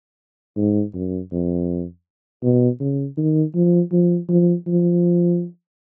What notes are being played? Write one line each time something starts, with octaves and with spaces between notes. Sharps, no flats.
G#2
F#2
F2
B2
C#3
D#3
F3
F3
F3
F3